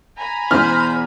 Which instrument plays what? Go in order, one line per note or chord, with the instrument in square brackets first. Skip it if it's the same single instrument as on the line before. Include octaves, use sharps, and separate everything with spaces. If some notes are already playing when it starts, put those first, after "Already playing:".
[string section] G#5 A#5 B5
[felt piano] E2 B2 E3 [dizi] C5 [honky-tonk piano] F6